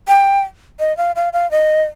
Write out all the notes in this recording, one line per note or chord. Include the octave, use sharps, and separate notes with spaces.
G5
D#5
F5
F5
F5
D#5